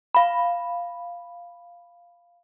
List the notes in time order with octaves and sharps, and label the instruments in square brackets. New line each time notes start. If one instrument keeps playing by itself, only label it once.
[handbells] F5 B5